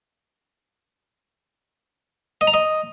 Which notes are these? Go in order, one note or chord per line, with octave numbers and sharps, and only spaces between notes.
D#5
A#5
D#5